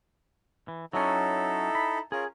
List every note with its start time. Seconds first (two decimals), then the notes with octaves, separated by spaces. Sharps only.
0.68 E3
0.93 F#3 C#4 D#4 E4 A4
1.75 B5
2.12 C#4 F4 G#4 A#4